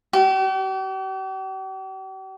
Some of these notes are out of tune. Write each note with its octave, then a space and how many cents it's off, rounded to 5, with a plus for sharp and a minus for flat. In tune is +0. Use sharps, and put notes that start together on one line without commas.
G4 -45